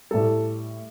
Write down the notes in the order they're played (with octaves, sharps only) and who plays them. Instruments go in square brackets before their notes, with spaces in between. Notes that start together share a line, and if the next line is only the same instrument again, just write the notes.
[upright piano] A2 G3 A4